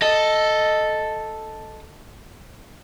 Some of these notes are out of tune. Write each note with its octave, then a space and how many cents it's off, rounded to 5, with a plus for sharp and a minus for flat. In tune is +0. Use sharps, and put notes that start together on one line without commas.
A4 +0 D#5 +0